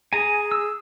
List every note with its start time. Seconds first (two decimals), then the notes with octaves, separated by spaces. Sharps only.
0.13 G#4 G#5 A#5
0.52 E6